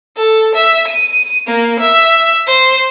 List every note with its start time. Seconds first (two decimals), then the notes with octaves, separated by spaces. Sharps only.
0.17 A4
0.55 E5
0.88 D#7
1.47 A#3
1.80 E5
2.47 C5